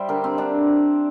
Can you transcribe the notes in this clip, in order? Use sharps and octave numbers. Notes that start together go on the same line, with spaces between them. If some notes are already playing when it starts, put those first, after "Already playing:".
Already playing: G3 C5 D5 E5 G5
D3 G4 A#4
C4
D3 D4